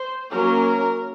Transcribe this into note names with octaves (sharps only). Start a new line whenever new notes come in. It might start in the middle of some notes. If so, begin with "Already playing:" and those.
Already playing: C5
F#3 A#3 C#4 A#4